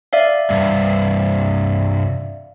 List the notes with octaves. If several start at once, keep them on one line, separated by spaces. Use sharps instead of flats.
D5 E5 F5
C2 G2